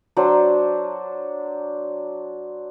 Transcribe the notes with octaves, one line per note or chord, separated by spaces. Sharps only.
F#3 D4 C5